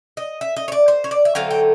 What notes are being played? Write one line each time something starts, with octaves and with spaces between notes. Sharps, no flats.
D#5
E5
D#5
C#5
D5
C5
C#5
D5
E5
D3 F#3 A3 C4 F5
G5